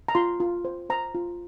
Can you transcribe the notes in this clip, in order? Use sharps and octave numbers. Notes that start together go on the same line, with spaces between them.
A#5
F4 C6
F4
C5
C5 A#5
F4